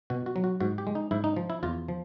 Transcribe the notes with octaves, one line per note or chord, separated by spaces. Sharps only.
B2 F#4
F#4
F#3
F#4
G#2 F#4
G4
G#3
D#4
G#2 E4
D#4
F3
E4
E2 F4
F3